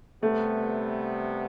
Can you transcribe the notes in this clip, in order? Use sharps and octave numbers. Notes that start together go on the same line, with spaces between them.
C3 G3 A3 B3